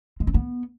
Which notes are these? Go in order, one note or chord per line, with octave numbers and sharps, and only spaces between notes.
G#3
C4
B3